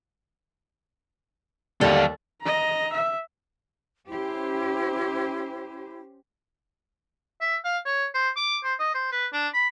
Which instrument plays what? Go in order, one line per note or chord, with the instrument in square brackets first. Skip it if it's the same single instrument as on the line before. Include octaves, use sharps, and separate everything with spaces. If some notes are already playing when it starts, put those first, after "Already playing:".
[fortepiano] D#2 G3 [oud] D3 [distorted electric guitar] A4 F5
[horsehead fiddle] D#5 A#5
E5
[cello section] C#4 G4 C5 [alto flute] E4
[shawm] E5
F5
C#5
C5
D6
C5
D#5
C5
B4
D4
B5